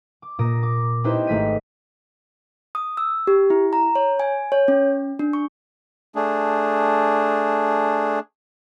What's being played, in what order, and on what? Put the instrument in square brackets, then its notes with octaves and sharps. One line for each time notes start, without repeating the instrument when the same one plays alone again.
[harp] D6
A#2 A#3 D#6 A#6 D7
D6
C4 D#4 E4 G4 B4 C5
G#1 A3 B6 D#7
[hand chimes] D#6
E6
G4
E4
A#5
C#5
G#5
C#5
C#4
D4
C#6
[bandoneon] A3 D4 G#4